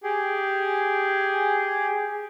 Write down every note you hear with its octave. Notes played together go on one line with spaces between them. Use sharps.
G4 G#4